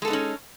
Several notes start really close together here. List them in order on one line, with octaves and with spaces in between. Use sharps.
G#3 A4 B3 D#4 C#4